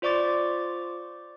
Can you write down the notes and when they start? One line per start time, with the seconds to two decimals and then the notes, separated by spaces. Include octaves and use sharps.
0.02 F4 C5 D5 C#6 D6 A6